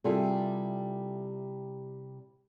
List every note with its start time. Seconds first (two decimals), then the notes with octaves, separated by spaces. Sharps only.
0.04 C3 G3 E4 F4 G#4 A4